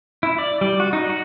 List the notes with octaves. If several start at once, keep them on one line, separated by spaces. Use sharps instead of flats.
E4
D5
G3
F#4
D#4
F#4